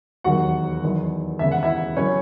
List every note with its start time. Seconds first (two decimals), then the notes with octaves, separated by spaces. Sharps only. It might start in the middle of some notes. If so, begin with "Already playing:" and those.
0.24 E1 D#2 D#3 F#3 F#4 F#5
0.82 E2 D#3 F#3
1.39 E1 D#2 C#3 E5
1.51 F#5
1.63 E4 E5
1.97 A2 F#3 C#4 C#5